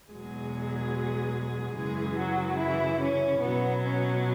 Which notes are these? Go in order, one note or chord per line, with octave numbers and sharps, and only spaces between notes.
E2 B2 F#3 G#3 G#4
F#2 C#3 E3 G#3 G#4
F#3 F#4
E3 E4
C#4
B2 F#3 B3
C#4